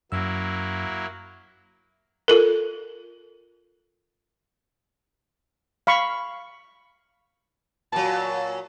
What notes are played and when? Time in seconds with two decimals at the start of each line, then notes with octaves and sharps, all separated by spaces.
0.12 F#2 F#3 A#3 E4 E6
2.28 F4 A4 A#4
5.87 F5 B5 C#6
7.92 A#2 F#3 A5